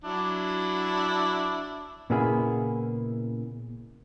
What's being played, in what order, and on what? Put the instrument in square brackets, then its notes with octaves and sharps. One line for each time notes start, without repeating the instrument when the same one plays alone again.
[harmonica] F#3 D4 E4
[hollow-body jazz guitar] A#2 C#3 A#3 B3 E4 G#4